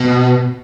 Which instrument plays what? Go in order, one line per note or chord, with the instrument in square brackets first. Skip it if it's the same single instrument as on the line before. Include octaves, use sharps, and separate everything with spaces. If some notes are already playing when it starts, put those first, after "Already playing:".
Already playing: [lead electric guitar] B2